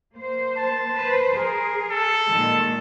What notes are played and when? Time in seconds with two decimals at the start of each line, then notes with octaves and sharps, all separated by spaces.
0.16 A#3 C5
0.57 A5
0.95 B4 C5
1.37 G#4 A#4
1.90 A4
2.30 A#2 D#3 G#3